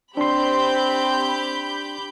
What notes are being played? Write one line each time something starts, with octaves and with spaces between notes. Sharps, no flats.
C4 D4 G4 B5 C6 G6